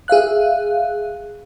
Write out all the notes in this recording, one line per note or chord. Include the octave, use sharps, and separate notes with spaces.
G#4 E5 F5 F#6